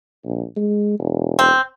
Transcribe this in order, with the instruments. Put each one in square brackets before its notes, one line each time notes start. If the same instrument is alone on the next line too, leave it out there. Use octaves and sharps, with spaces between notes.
[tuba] A#1
G#3
E1
[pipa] C4